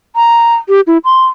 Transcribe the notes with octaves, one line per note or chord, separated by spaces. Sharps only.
A#5
G4
E4
C6